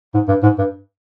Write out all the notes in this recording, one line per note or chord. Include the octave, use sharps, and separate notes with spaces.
G#2
G2
G#2
G2